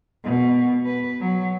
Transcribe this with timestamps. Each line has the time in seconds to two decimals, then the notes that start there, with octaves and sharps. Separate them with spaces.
0.24 B2
0.86 B4
1.21 F#3